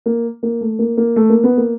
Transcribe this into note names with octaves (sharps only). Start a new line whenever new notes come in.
A#3
A#3
A3
A#3
A#3
A3
A#3
B3
A#3